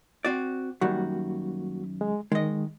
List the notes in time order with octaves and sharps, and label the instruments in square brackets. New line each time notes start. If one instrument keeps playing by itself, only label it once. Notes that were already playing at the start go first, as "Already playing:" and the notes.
[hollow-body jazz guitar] C4 F#4 D5
[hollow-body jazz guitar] F#2 D#3 [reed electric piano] G3 A#3 F#4
[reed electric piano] G#3
[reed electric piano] D#3 [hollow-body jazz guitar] G#3 D#5